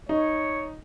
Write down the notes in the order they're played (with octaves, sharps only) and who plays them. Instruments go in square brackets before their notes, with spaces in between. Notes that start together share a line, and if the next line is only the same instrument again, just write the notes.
[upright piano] D#4 [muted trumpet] C#5